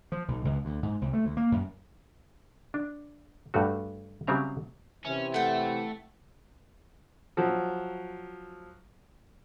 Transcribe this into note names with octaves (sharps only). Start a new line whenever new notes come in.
F3
B1
C#2
D2
G#2
C2
A3
D2
A#3
F#2
D4
G2 G3 A3 F#4
C#3 F#3 G3 C4 E5 A#5
C3 E3 C#4 E4
A3 F#5 G5
F3 F#3